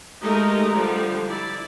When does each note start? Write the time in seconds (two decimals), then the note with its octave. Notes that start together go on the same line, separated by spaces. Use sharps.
0.21 G#3 A3 D#4 G4 A#4 D#5
0.72 D3 F3 G3 D5
1.26 E4 D5